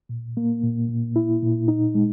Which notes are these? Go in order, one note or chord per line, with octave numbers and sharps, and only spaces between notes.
A#2
A#3
A#2
A#2
E4
A#2
D#4
G#3